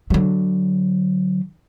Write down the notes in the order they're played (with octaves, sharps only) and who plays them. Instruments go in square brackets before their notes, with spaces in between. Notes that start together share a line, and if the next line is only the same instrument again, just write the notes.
[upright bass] D3 F#3